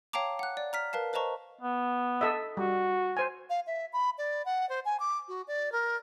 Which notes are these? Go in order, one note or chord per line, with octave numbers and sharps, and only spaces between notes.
C#5 F5 G5 A5 A#5 D6
F#5 F#6
D5
A#5 F6 B6
A#4 B4 F5 A5
B4 C5 D#5 A5 A#5 C#6
B3
A4 D#5 E5
G3 F#4
C5 G#5
F5
E5
B5
D5
F#5
C5
G#5
D6
F#4
D5
A#4